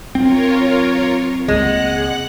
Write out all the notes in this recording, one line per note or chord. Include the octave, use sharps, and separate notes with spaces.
F#3 C4 F4 A#4 C#5
C#2 G#3 A#3 F#5 F#6